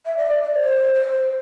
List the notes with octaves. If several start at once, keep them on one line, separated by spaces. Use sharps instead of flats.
E5
D5
D5
C5
C5